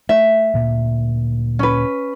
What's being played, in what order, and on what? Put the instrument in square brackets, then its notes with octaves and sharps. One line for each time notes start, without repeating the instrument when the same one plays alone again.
[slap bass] A3 [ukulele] E5
[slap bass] D2 A#2
[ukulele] C#4 B4